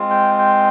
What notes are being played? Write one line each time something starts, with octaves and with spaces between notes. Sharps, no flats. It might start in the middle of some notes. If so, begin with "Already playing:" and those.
Already playing: G#3 C4 F4
G5
G5